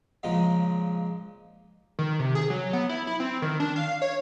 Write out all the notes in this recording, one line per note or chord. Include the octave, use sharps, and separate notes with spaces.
A#2 C#3 F3 G#3
D#3
C3
G#4
F#3
B3
E4
E4
C4
D#3
D4
F5
C#5